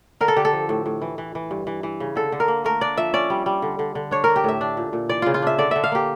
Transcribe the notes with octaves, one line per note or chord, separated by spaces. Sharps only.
D3 A#4
A4
D3 G4
A4
F3
A2
A2
E3
E3
E3
G2
E3
E3
C#3
D3 A4
D3
A#4
A#3
A3 A#4
D4 D5
F3 E5
C#4 D5
G3
G3
D3
D3
D3
D4 C#5
D4 A#4
G4
A2 E5
D4
A#2
A#2
E3 D5
C#3 F4
F4
D4 E5
D3 D5
D3 E5
F5
A#3 G4